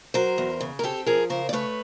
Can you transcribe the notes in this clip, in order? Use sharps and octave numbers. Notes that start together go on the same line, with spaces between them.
F#3 A#4 C5
E2
C#3
A#4
C4 G4 A4
F3 G#4 A#4
C#3 A#4 C5
D5
A3 B4 C#5